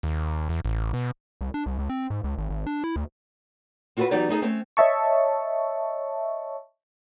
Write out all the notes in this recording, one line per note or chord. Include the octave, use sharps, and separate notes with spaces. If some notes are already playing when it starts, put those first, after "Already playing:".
D#2
E2
A1
B2
C2
D4
C2
C#2
C4
G#2
C#2
G#1
G#1
D4
E4
D2
C4 F4 F#4 G#4 A4 B4
E3 F#3 B3 D#4 G4 D5
A3 D#4 G#4 A4
A3 C4 C#4
C#5 D#5 E5 A5 C#6